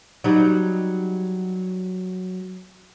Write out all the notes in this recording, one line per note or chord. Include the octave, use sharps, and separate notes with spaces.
F#3 G3 D#4